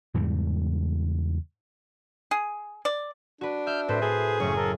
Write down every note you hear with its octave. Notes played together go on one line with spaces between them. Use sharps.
E2 G#2 C#3 G3
G#4
D5
D4 F#4 B4
E5 F6 G6
A2 C4 A4 B4 C5
G#4 A4
F#1 A3 C4 C#4 C#6
A4 A#4